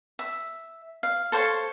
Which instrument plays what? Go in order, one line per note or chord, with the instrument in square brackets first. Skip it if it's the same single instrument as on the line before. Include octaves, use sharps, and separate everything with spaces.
[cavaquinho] E5
F5
A4 C5 C#5 F5